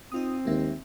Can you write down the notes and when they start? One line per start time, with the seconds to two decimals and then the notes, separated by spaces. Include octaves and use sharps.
0.12 C4 D#4 F4 D#6
0.47 D#2 G#3 A#3 E5